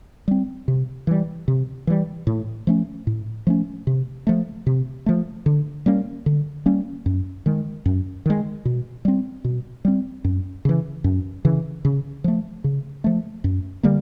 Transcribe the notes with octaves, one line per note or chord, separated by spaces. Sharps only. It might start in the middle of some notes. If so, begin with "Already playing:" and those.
G3 C4
C3
E3 G3
C3
E3 G3
A2
F3 A3 C#4
A2
F3 A3 C#4
C3
F3 A3
C3
F3 A3
D3
G3 A#3 C#4
D3
G3 A#3 C#4
F#2
D#3 G#3
F#2
D#3 G#3
B2
G3 C4
B2
G3 C4
F#2
C#3 E3
F#2
C#3 E3
C#3
F3 A3
C#3
F3 A3
F#2
D3 G3 A#3